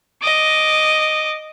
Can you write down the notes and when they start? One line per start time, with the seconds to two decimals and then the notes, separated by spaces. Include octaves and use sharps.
0.22 D#5 D6